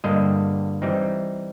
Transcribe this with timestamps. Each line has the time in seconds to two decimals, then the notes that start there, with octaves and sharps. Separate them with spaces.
0.04 G2 D3 G3 A#3 D#5
0.82 E3 G3 C4 D#4